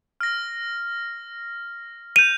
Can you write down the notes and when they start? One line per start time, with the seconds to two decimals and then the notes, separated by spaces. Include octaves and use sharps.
0.21 F6 A#6
2.16 G6 D#7 F7